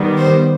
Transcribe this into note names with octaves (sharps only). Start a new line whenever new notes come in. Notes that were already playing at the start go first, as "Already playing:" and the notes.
Already playing: D#3 G3 B3
C5